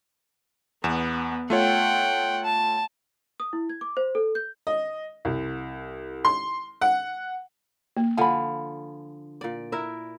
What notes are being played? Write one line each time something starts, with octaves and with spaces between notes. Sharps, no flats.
E2 B3 E7
A3 F4 C#5 F#5 G5
A5
D#6
E4
G#6
D6
C5
A4
G6
D#5
C2
C6
F#5
A#3
D3 F3 F5 G#5 B5
A#2 D5
E4 A#4 E5